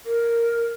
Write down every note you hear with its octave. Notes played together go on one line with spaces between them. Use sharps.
A#4